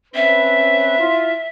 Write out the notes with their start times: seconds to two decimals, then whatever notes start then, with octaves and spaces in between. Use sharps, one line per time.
0.15 C4 C#4 B4 E5
0.99 E4 F4